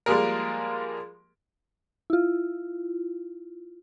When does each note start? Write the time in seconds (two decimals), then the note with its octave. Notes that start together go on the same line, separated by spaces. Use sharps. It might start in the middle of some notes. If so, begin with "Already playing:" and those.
0.06 F3 G3 G#3 A#3 G#4 A#4
2.10 E4 F4